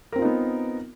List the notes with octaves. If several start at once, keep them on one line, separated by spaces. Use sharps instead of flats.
B3 C4 D#4 F4 A#4